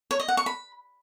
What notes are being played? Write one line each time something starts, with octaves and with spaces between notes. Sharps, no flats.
C#5
D#5
F#5
C#6
B5